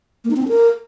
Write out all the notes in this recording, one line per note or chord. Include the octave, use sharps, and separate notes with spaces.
A#3
D#4
C4
D4
A#4